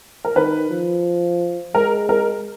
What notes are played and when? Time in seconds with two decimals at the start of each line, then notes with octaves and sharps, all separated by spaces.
0.25 A#4
0.36 D#3 B4
0.70 F3
1.75 G#3 A#4
2.09 A#4